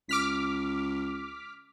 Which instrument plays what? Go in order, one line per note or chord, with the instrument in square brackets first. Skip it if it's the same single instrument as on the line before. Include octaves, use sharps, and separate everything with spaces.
[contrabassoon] C#2 [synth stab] D6 F6 B6